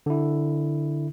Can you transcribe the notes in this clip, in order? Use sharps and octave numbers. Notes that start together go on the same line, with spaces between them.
D3 E4